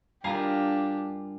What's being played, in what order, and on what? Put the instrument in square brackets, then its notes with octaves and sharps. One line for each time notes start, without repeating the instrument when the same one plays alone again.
[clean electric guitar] G2 F4 A#4 [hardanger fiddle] D4 G4 [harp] F5 G#5 A#5